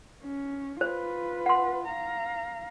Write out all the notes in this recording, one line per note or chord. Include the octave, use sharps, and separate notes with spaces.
C#4
F4 B4 C5
F#5 C6
F5 A#5